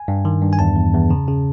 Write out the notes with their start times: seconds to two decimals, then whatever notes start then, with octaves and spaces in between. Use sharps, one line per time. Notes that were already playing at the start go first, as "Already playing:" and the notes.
Already playing: G#5
0.08 G2
0.25 D#3
0.42 G2
0.53 G#5
0.59 E2 A5
0.76 E2
0.94 E2
1.10 C#3
1.27 C#3